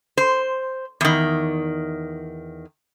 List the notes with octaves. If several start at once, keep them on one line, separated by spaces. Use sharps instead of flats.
C5
E2 D#3